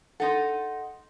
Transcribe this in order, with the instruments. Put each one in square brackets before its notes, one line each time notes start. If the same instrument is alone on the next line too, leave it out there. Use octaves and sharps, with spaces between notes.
[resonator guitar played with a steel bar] D#4 A4 [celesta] F#5 C6